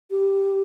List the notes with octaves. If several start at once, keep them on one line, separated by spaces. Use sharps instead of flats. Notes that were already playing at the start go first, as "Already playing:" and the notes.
G4